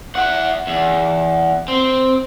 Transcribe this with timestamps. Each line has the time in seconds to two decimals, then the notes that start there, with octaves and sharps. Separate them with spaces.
0.15 E4 F#5
0.67 E2
1.68 C4